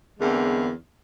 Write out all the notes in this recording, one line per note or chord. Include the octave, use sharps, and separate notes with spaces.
E2 D3 E3 G#3 A#3 C4